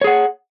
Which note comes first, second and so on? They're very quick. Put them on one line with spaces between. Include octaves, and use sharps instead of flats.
C#5 G#4 F#5